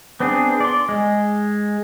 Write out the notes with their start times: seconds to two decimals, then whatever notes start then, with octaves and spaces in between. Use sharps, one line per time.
0.20 B3 C4 D4 G#4
0.60 D5 C6
0.89 G#3